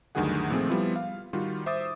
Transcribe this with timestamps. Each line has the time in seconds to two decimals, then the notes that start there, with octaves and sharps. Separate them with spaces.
0.15 D2 G2 D#3 F#3 G#4 F#5
0.50 A#2 D#3 F3 A3 C4 G#4
0.69 F3 G3 B3 E4 F4
0.96 F5
1.33 D#3 G3 F4 F#4
1.66 C5 E5 D6 D#6 A6